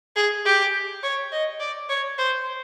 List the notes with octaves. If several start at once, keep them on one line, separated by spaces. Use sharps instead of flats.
G#4
G4
C#5
D#5
D5
C#5
C5